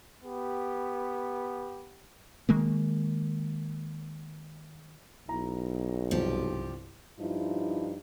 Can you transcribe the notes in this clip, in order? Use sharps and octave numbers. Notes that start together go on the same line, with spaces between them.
B3 G4
D#3 G#3 A#3
B1 E4 A#5
C2 G2 F3 G4
G2 F3 D#4 E4